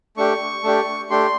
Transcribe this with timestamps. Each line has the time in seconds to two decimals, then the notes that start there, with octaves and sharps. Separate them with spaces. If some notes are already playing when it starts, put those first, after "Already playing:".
0.17 A3 D4 G4 C#6
0.63 A3 D4 G4
1.10 A3 D4 G4 C6